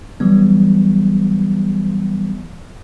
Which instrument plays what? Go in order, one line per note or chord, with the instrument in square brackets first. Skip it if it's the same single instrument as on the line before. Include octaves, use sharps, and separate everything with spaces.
[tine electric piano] E3 F#3 G3 B3